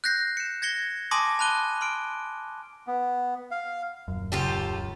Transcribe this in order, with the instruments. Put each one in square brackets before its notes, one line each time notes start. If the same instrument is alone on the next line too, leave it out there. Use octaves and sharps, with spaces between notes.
[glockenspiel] F#6 G6 A#6 C7
C#7 E7
G#6 A#6 C#7 G7
G#5 A5 C6 D6 D#6 A#6
A5 B5 F#6 D#7 G7
C6 F6 D7
[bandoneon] B3
F5
[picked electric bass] D#1 F#2
[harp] C#2 G#5 [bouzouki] F4 G4 A4